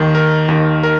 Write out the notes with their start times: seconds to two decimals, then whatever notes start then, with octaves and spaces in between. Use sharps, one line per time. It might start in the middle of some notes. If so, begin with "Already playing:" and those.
Already playing: D#2 D#3
0.15 A#4
0.48 D#2 D#3
0.83 A#4